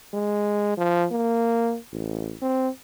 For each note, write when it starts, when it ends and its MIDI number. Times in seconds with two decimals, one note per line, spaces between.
0.14 0.74 56
0.77 1.06 53
1.12 1.76 58
1.92 2.34 33
2.42 2.69 60